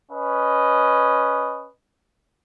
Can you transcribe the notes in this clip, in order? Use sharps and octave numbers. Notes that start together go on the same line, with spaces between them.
C#4 B4 D#5